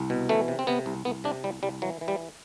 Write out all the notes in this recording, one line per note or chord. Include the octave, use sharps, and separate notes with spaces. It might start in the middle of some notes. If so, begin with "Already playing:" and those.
Already playing: C2
B2
E3 A3
C3
C4
C3 B3
C2
C2 B3
C3 D4
C2 G3
C2 G3
E3 F#3
E3
G3